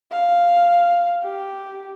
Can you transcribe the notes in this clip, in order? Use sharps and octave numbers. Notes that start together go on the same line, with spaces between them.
F5
G4